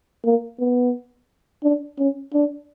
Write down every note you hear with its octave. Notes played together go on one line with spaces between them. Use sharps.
A#3
B3
D4
C#4
D4